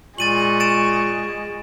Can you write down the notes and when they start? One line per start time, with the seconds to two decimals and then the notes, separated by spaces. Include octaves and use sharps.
0.18 A#2 G#3 C#6 A6 D#7 F#7
0.60 A6 D7 E7